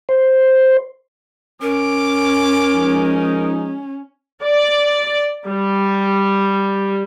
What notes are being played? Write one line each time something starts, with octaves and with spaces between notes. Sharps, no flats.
C5
C#4 A#4 D6
F3 G#3 D#4
D5
G3